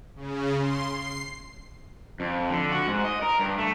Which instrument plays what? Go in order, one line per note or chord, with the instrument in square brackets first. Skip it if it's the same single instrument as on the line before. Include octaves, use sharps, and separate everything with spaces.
[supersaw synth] C#3
C6
C7
[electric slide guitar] F2
D3
F#4
G#2
D#5
A#4
G2
A3